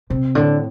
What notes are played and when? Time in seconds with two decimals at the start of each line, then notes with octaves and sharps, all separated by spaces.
0.10 C3 C4
0.35 A2 D3